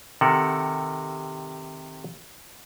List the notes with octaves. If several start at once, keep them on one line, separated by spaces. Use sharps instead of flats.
C3 D#3 A4 A#4 F#5